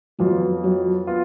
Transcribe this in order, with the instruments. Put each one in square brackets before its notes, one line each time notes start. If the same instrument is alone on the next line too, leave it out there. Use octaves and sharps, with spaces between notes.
[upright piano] F2 F3 B3 F4 [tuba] F#3
[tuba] F#3
[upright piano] B3 F4